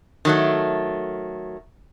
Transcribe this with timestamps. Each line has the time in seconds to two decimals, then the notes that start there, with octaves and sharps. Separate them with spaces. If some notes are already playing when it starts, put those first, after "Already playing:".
0.25 D#3 F#3 A3